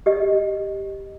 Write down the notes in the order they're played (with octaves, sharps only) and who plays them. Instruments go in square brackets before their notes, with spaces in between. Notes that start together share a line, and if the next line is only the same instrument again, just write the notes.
[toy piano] G4 D#5